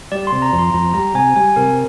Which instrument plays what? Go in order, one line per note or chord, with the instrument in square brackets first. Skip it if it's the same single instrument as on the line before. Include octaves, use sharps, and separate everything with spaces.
[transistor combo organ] G3 [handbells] D5
[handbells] C6
[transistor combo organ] C3
[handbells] A#5
[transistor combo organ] F2
[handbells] C6
[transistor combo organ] F2 [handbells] A#5
[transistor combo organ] G3 [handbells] A#5
[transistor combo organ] C3 [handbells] G#5
[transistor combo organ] G3 [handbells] G#5
[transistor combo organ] C3 [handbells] A#4